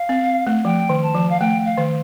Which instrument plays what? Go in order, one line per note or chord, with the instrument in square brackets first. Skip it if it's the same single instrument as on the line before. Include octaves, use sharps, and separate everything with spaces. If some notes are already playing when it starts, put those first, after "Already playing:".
Already playing: [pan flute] F5
[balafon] C4
A3
[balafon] F3 [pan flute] G5
[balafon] D#3
[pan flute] A5
[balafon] F3
[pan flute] F5
[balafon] A3 [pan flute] G5
[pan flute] F5
[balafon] D#3